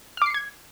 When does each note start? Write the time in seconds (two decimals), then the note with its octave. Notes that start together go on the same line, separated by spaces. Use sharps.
0.17 F6
0.22 D6
0.26 C7
0.30 C#7
0.34 G#6